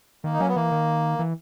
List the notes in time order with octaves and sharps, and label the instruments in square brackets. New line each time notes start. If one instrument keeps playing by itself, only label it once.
[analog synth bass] D#3 [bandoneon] A#3
[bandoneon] D#4
[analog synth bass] F#3 [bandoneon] C#4
[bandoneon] B3
[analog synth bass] E3 [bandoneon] A#3
[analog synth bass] D#3
E3